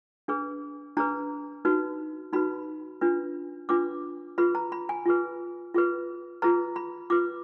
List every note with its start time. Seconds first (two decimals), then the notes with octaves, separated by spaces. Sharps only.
0.28 D4 G#4 B4
0.97 D4 G#4 B4 A#5
1.65 D#4 F#4 B4
2.33 D#4 F#4 B4 B5
3.01 D4 F4 B4
3.69 D4 F4 B4 D6
4.38 F4 G#4 B4 B5
4.55 A#5
4.72 B5
4.89 G#5
5.06 F4 G#4 B4
5.74 F4 G#4 B4
6.42 F4 G#4 B4 A#5
6.76 B5
7.10 F4 B4 D6